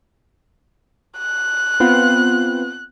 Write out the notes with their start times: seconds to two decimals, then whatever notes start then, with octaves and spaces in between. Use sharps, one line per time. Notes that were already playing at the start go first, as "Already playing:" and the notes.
1.18 F#6
1.80 B3 C4 F4